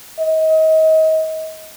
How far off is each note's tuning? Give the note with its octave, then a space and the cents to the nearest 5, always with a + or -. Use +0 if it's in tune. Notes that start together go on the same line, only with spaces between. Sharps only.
D#5 +30